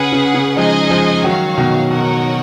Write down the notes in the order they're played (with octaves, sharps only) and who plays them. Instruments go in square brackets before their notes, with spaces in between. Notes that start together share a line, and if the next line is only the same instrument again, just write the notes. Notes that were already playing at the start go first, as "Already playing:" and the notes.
Already playing: [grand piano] C#3 [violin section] G#4 B4 F#5
[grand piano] C#3
C#3
[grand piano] F3 G#3 [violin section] D#4 G#4 D#5 G#5
[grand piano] F3 G#3
[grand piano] D#3 F#3 [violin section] F#4 C#5 F5
[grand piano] B2 D#3
[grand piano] B2 [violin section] D#4 F#4 A#4 C#5 F#5